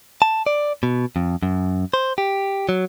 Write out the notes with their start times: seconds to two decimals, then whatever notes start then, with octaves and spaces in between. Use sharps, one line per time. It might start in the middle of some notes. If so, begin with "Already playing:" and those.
0.22 A5
0.47 D5
0.83 B2
1.16 F2
1.43 F#2
1.94 C5
2.18 G4
2.69 F#3